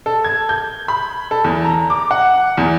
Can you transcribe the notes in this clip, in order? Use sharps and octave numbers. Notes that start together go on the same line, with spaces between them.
A4
G#6
G6
B5
A4
E2
A#5
D6
F#5
E2